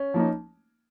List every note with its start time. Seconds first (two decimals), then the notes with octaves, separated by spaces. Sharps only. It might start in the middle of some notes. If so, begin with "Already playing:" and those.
Already playing: C#4
0.14 F3 A#3 D#4